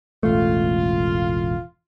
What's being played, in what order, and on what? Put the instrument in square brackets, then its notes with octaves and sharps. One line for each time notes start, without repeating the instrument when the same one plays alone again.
[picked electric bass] E1 A1 A3 [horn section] F4